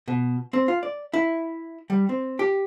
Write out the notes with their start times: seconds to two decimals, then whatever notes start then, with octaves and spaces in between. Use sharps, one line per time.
0.08 B2
0.53 C4
0.68 F4
0.83 D5
1.13 E4
1.90 G3
2.09 C4
2.39 G4